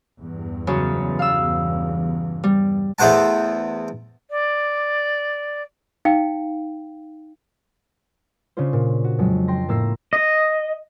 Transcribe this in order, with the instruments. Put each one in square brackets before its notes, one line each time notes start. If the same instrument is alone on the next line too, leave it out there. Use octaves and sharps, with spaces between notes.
[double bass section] E2 G2
[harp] F#2 C#3
F5 E6
G3
[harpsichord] E2 A3 C5 F#5 A5
[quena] D5
[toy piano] D#4 F5 G5
[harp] C#3 C#4 D4 F4 C5
A#2
F#4
F2 F#3 G#3
G5 C6 A#6
A2 A#3 E6 A#6 C7
[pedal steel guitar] D#5